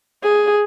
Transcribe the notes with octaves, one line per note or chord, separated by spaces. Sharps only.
G#4